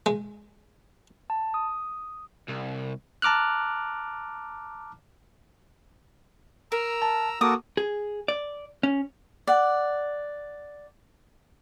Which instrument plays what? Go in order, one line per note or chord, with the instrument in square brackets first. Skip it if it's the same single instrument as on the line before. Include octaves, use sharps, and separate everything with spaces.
[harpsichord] G#3
[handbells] A5
D#6
[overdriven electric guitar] C2
[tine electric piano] A5 A#5 D6 F6 F#6
[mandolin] A#4 [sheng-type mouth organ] A#5 E6
[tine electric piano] A5
[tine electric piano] A#3 D6 [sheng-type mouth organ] F#4 A4 A#4 [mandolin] D#6
[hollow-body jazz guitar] G#4
D5
C#4
[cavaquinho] D5 F#5